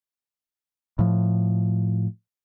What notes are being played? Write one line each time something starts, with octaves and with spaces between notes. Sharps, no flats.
A2 F3